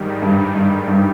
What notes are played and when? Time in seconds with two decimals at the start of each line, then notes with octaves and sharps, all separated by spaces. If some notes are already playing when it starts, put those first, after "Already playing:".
Already playing: G#2 D#3 G3
0.22 G2
0.55 G2
0.88 G2